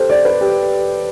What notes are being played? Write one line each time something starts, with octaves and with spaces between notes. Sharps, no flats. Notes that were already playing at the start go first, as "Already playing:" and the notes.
Already playing: G4 A4 C5
D5
B4
G4